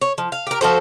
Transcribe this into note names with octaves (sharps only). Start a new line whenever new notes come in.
C#5
F3
F5
G4 A#4
F3 F#4 A4 C5